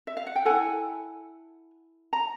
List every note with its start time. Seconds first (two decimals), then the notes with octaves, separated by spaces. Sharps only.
0.07 E5
0.17 F5
0.27 F#5
0.36 G5
0.45 E4 A4 F#5 G#5
2.13 A#5